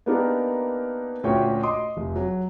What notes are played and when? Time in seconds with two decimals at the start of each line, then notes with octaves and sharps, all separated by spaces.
0.06 A#3 B3 D4 D#4 G4 A#4
1.23 D2 A#2 C#4 F#4 C#5 G5
1.63 D#5 C6 D6 D#6
1.97 F1
2.16 F#3